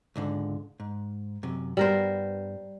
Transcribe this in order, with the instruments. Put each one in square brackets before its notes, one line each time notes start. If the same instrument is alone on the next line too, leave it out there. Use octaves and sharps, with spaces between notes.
[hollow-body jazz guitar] C#2 G#2 D3
G#2
F#2 C3
[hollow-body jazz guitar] G2 B3 [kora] G3 A#4 C5